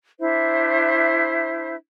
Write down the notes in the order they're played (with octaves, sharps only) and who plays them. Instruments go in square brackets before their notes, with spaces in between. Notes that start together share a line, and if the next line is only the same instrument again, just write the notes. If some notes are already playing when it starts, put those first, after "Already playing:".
[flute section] D4 E4 C5 E5